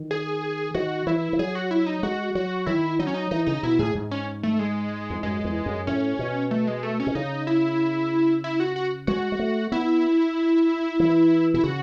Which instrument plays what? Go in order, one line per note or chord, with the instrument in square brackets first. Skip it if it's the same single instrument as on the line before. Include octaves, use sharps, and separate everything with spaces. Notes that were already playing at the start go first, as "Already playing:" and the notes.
Already playing: [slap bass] D#3
[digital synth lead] G#4
[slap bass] D#3 [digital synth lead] F#4
[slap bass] E3 [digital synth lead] E4
[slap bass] E3
[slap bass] F#3 [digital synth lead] G#4
[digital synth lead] F#4
E4
D#4
[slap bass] G#3 [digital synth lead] F#4
[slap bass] F#3 [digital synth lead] F#4
[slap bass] D#3 [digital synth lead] E4
[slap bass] F#3 [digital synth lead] D#4
[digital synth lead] C#4
D#4
[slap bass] E3 [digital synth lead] D#4
[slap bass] C#3 [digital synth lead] D#4
[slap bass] B2 [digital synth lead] E4
[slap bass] A2 [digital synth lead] G#4
[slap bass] G#2
[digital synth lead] C#4
A3
G#3
[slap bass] E2
[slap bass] F#2 [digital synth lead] G#3
[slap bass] E2
F#2
[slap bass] A2 [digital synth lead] C#4
[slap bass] B2
[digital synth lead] A3
G#3
A3
C#4
[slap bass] B2
[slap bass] C#3 [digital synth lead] D#4
[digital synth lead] E4
E4
F#4
F#4
[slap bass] G#3 [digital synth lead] F#4
[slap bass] G#3
A3
[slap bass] B3 [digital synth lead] E4
[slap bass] E3
[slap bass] B2 [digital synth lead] E4
[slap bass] C#3 [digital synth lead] F#4